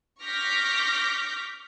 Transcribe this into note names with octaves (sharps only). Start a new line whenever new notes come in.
C#6 D6 F6 G6 A#6 B6